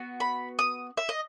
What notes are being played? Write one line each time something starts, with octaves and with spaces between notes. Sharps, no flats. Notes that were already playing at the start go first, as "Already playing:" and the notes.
Already playing: B3 F#4
B5
D#6
E5
D#5